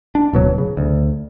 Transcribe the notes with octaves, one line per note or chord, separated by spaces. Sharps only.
D4
D1 B2 F#3
C#3
D2